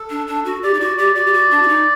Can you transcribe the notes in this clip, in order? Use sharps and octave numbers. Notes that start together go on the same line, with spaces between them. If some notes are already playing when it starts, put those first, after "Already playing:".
Already playing: A4
D4
D4
F#4
G4 D5
D#4
F#4 D5
G4 D5
F#4 D5
G4
F#4
D4
F#4
D#4